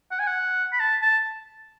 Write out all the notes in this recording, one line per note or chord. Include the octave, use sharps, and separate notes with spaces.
F#5
G#5
F#5
B5
A5
A5